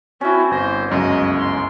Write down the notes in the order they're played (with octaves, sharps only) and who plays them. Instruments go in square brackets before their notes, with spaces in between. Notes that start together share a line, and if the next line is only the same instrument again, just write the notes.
[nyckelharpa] C4 F#4 [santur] C#4 E4
[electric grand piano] G1 A#6 [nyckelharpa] C5
[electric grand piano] G1 C#2 F#2 [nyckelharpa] D#5
[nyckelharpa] C6